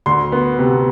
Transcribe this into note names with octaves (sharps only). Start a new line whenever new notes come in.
D2 C6
B3
C3